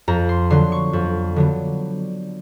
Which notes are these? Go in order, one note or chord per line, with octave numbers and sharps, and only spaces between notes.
F2 A#5
C6
D3 F#3 B3 C6
C#6
F2
D3 F#3 B3